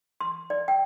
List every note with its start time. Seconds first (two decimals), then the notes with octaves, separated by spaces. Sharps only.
0.20 C6
0.50 D5
0.68 G5